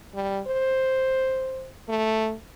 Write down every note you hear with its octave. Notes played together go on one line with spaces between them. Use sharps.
G3
C5
A3